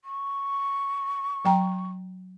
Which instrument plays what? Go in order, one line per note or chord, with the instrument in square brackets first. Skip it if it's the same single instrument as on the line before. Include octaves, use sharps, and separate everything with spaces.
[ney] C#6
[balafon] F#3 G5 A#5